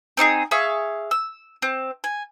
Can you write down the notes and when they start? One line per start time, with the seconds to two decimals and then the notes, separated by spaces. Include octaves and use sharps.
0.17 C4 D#4 F#4 G#4
0.51 G#4 E5 F5 C#6
1.11 E6
1.62 C4
2.04 G#5